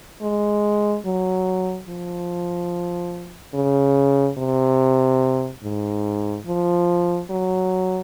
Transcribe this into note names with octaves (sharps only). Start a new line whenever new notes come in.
G#3
F#3
F3
C#3
C3
G#2
F3
F#3